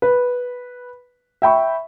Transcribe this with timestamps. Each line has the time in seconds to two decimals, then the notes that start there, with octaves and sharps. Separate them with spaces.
0.02 B4
1.42 E5 G5 B5 C#6